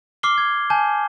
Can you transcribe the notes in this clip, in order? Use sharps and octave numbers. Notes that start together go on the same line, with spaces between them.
D6 F6 C7 G7
G#6
G#5 A5 G6